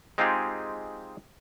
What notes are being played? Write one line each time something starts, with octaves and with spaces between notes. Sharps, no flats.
G#3 C4 D#4 F4 G4 G#4